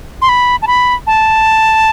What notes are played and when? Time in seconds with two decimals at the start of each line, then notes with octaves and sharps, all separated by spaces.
0.22 C6
0.29 B5
0.62 A5
0.67 B5
1.07 A5